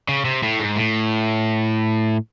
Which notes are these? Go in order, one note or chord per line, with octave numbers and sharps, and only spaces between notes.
C#3
C3
A2
G#2
A2